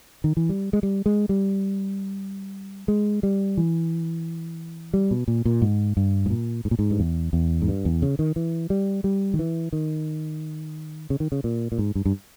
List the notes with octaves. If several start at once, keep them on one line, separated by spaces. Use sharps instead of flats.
D#3
E3
G3
G#3
G3
G#3
G3
G#3
G3
E3
G3
B2
A#2
A#2
G#2
G2
G#2
A#2
G#2
A#2
G#2
G2
E2
E2
G#2
G2
E2
C#3
D#3
E3
G3
G3
D#3
E3
D#3
C#3
D#3
C#3
A#2
A#2
G#2
G2
G2